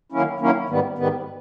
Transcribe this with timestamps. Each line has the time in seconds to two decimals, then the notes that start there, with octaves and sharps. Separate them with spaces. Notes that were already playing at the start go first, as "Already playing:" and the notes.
0.12 D#3 F#3 A#3 C#4 E4
0.40 D#3 F#3 A#3 C#4 E4
0.69 G#2 D#3 G3 B3
0.98 G#2 D#3 G3 B3